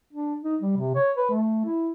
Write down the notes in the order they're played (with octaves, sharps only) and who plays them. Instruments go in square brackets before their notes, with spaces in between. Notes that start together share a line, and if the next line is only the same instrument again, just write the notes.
[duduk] D4
D#4
G3
C3
C#5
B4
A3
E4